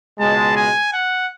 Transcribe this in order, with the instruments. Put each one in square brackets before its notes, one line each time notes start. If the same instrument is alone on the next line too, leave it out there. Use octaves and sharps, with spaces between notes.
[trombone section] C#2 B2 G#3 [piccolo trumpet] A5
[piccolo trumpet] G#5
F#5